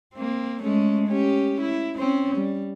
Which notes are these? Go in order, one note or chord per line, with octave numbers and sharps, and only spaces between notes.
A#3 C4
G#3 A3 C#4
C#4 G4
E4
C4 C#4
G3